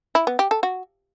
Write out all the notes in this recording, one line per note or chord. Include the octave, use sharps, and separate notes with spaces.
E4
B3
G4
A4
F#4